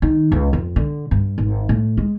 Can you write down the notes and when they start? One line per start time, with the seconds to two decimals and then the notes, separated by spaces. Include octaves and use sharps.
0.02 D#3
0.32 C#2
0.53 F2
0.76 D3
1.11 G2
1.38 G#1
1.69 A2
1.97 G#3